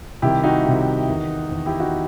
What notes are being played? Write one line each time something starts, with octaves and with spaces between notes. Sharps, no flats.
C2 C3 D#3 E4 G4
D#4 F#4
C2 C3 D#3
E2 D#3
E2 D#3
E4 G4
D#4 F#4